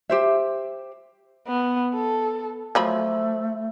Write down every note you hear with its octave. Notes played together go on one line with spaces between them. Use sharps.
G4 C5 E5
B3
A4
F3 F#3 A3 B5